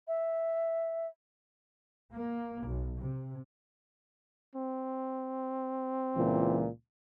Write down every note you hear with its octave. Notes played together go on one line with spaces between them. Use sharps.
E5
A#3
B1
C3
C4
C#2 A#2 E3